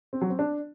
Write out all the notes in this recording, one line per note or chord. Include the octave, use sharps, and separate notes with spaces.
C4
F#3
C4
D4